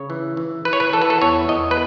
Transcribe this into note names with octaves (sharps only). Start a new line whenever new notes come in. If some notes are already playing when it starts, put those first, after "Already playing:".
Already playing: C#3 C#5
E3
E3
E3 B4
C#5
B4
E3 A4
B4
A4
E2 C#5
E2 D#5
B4